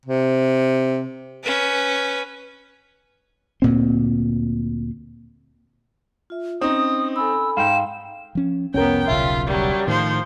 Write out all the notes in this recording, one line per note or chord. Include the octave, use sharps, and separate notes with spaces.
C3
C#4 B4
D2 A#2 C4
F4 E5
C4 C#4 D#4 D#6
A4 G#5 B5 E6
G#2 F5 G5 E7
F3 C#4
C2 F2 B3 C#4 A#4 G5
D#1 B1 C#3 F4 E5
F#3 G3
A2 D#3 F3 C5